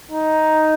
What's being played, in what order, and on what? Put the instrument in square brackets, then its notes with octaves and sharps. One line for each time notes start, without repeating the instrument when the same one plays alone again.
[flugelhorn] D#4